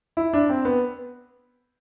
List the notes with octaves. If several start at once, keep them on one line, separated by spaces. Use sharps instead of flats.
E4
D4
C4
B3